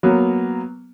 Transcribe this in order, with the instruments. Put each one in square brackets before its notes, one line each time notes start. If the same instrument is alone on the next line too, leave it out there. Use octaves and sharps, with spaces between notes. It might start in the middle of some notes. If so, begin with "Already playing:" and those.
[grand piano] F#3 A#3 B3